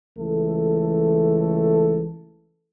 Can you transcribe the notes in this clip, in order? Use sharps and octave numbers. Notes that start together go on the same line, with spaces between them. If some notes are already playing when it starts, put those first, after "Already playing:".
C#2 E3 A3 A4